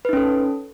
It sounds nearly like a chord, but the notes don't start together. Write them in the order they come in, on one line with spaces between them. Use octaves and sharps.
B4 D#4 C#4 A4